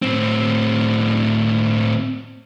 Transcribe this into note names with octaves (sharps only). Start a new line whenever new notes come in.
A2 C4